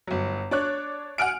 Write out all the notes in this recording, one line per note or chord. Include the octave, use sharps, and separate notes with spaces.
G1 F#3
D4 C#5 F#6
F#5 G#5 F6 D7